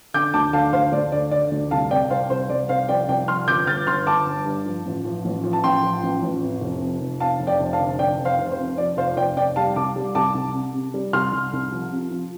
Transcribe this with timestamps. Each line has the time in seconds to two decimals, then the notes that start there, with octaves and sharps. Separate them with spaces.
0.14 D3 D6 G6
0.34 D2 A5 D6
0.53 D3 F5 A5
0.72 D2 C5 F5
0.92 D2 D5
1.12 D3 D5
1.31 D3 D5
1.51 D2
1.71 C2 F5 A5
1.91 C3 D5 G5
2.10 C2 C5 F5
2.30 C2 C5
2.50 C2 D5
2.69 C2 C5 F5
2.89 F3 D5 G5
3.09 C2 D5 G5
3.28 F3 C6 F6
3.47 G1 D6 G6
3.67 G1 F6 A6
3.87 G1 C6 F6
4.06 G1 A5 D6
4.26 G1
4.46 G2
4.66 F3
4.86 A1
5.05 F3
5.25 A1
5.44 F3
5.53 A5
5.64 A1 G5 C6
5.83 F3
6.03 A1
6.22 A1
6.42 F2
6.61 F1
6.82 F2
7.01 F1
7.20 F2 F5 A5
7.40 F1
7.47 D5 G5
7.60 F1
7.73 F5 A5
7.80 D3
7.99 F1 D5 G5
8.19 F1
8.25 C5 F5
8.39 F1
8.52 C5
8.59 F2
8.78 F3 D5
8.97 F1 C5 F5
9.17 F1 D5 G5
9.37 F1 D5 G5
9.56 G3 F5 A5
9.76 C2 A5 D6
9.96 G3
10.15 C2 A5 D6
10.35 C2
10.55 C3
10.74 C3
10.94 G3
11.13 C2 C6 F6
11.33 C2
11.53 C2
11.72 F3
11.92 C3
12.11 F3